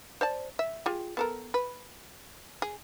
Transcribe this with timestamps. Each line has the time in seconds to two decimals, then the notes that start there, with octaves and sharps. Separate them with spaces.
0.21 C5 D5 A5
0.59 E5
0.86 F4 G4 G#4
1.17 B3 A4 A#4
1.54 B4
2.62 G#4